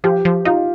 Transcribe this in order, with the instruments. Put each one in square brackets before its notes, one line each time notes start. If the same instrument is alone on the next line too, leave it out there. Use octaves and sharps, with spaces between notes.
[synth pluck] F3 [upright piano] G4
[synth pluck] F3
[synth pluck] D#4 [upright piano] F4